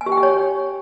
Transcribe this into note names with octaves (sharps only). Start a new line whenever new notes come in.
G#5
G4
G5
G4
C#5